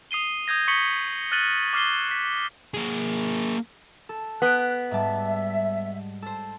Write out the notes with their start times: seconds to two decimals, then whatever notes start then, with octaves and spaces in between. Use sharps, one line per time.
0.11 D#6 C7 D#7 G7
0.48 D#6 G6 G#6 A#6
0.68 C#6 D#6 B6 C#7 F#7 G7
1.32 F6 F#6 A6 D#7 F#7
1.73 D6 F6 C7 G7
2.11 B6
2.74 A#3 G#4
4.09 A4
4.42 B3 F#6 B6 D7
4.91 G#2 G3 E5 A5
6.22 A4 C5